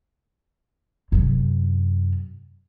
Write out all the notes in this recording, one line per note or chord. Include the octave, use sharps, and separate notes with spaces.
F#2 C3